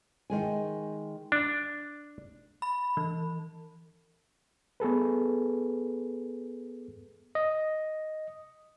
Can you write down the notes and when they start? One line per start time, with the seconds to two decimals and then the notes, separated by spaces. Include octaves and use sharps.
0.30 D#3 G#3 G#5
1.32 D4
2.62 B5
2.97 E3
4.80 B3 G#4 A4 B4
7.35 D#5